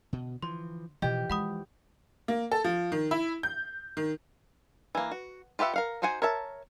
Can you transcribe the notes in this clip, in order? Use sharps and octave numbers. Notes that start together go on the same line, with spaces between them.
B2 D3
E3 F3 C6
B2 E3 F3 G4 D#5
G#3 F#5 B5 D#6
A#3
A4
F3
D#3
E4
G6
D#3
E3 A#3
F#4
F4 G4 B4 E5 F#5
A#4 F5 F#5
D#4 F#4 C5 F#5 G#5
A#4 C#5 E5 A5